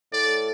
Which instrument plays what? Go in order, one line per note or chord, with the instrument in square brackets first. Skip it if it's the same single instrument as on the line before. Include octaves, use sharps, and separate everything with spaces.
[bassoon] A2 [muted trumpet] D5